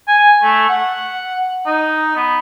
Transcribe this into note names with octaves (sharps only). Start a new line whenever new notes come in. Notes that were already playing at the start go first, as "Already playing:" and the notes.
G#5
A3
F#5
D#4
B3